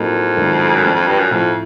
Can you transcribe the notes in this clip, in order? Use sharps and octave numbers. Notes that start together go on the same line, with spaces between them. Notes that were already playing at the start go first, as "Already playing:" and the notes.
Already playing: F2 A2 F#3 A#3 D#4
G#2 D#3 F#3 A3 D4
F#2
F2 F3 A3 D4
F2
G2
F#2
F2 A2 F3 A3